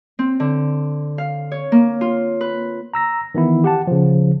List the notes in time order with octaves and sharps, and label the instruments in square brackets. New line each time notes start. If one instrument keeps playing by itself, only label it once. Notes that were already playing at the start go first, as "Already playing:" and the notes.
[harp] C4
D3
F5
C#5
A#3
F4
B4
[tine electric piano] A#5 E6 A#6
D#3 E3 B3 E4
G4 F#5 A5
C#3 F3